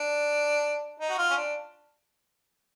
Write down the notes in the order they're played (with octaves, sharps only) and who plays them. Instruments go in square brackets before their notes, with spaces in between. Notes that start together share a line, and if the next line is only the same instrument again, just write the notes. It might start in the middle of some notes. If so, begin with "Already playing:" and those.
Already playing: [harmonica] D4
D#4
F#4
F4
C#4
D4